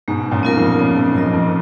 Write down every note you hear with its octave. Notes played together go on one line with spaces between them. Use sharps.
G#2 B2 G#3
F#2 A#2
B3 F4 A#4
F2 G#2
F#2 B3
F2
G#2
F#2 F4 A#4 D#5
F2